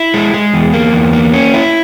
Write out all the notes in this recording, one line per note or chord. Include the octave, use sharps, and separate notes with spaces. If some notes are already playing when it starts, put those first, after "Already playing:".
Already playing: E4
G#3
G#3
E2
A#3
E2
A#3
C#4
E4